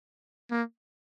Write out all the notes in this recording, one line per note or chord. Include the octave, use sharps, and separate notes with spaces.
A#3